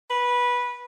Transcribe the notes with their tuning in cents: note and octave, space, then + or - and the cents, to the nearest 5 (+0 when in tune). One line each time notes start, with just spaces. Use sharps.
B4 -15